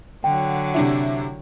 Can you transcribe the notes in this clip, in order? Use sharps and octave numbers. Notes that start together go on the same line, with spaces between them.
D3 F#3 G5
C3 D4 E4